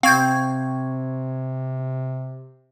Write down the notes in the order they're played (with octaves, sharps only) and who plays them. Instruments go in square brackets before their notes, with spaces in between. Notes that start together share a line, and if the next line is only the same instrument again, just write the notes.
[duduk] C3 [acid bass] C4 [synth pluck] F5 G6 [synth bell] G5 C#6 G#6